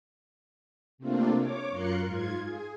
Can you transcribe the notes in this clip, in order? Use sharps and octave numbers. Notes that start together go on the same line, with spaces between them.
C3 A3 A#3 C4 D4 F4
C#5 D6
F#2 F4 A#4 C6 F#6 C#7
G#2 F4 G#6
G#4